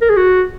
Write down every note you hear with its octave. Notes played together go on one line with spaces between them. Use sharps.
A#4
G#4
F#4